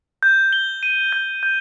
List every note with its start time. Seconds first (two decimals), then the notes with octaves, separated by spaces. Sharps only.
0.23 G6
0.53 G7
0.83 D#7
1.12 G6
1.43 G6